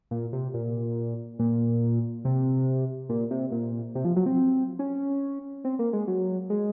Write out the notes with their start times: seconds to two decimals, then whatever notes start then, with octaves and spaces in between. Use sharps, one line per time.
0.11 A#2
0.33 C3
0.54 A#2
1.39 A#2
2.25 C3
3.09 A#2
3.31 C3
3.51 A#2
3.95 C3
4.05 F3
4.16 F#3
4.26 C4
4.79 C#4
5.64 C4
5.79 A#3
5.93 G#3
6.07 F#3
6.50 G#3